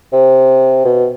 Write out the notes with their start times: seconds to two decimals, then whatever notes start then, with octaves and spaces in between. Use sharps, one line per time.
0.13 C3
0.85 B2